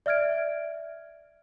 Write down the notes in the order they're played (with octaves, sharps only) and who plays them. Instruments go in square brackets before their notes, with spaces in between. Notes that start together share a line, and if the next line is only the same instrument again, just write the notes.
[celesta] D5 E5 F6 G#6 D7